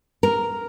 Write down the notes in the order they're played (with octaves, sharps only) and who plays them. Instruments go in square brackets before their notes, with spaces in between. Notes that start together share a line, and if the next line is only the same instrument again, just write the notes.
[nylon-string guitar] A#4